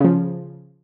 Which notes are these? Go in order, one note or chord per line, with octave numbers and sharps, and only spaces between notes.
C#3 F3